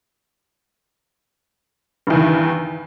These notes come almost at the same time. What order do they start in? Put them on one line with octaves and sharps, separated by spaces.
G2 E2 D#3